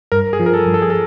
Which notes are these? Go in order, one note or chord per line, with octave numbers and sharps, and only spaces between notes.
G2 A#4
G#4
F3
A#4
A4
G2
A4
G#4
A4